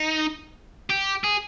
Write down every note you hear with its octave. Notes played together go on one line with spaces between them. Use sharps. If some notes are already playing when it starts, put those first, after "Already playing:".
Already playing: D#4
G4
G#4